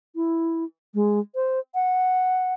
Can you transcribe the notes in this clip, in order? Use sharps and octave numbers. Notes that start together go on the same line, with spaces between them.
E4
G#3
C5
F#5